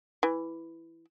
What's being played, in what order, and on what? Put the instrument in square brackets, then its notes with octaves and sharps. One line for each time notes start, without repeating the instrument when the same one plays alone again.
[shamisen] E3